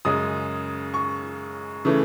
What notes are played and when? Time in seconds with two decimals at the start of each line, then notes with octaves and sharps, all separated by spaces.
0.05 F#2 C#3 G#3 D#6
0.94 C#6
1.85 C#3 E3 A3